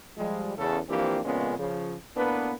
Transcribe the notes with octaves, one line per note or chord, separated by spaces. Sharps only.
F3 G3 G#3
E2 C#3 A4
E3 F3 A#3 C4 D4 G4
F2 A#2 C#3 G#3 B3 C#4
C#3 F3
A2 A#3 B3 D4 B4